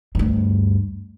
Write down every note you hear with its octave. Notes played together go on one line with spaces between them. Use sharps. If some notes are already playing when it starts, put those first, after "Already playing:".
D2 G2